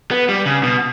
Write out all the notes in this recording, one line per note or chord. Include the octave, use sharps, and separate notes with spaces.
B3
G3
C#3
B2